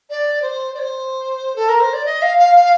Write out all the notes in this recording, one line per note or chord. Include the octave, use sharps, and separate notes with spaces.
D5
C5
D5
C5
A4
A#4
C5
D5
D#5
F5
F5
F5